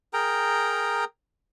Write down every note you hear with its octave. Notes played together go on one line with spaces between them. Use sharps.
G#4 A#4 G5 A#5